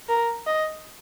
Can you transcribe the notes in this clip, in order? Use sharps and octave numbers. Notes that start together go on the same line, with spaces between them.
A#4
D#5